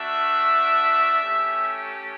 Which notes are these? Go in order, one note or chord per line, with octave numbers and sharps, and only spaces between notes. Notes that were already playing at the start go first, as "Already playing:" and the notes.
Already playing: A3 D4 F#4 E5
A3 C#4 G4